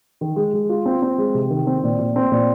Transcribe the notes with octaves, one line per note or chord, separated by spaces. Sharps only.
D#3
G#3
G#3
F4
C4
C4
G#3
C3
D#3
C4
A#2
A#2
C4
A#2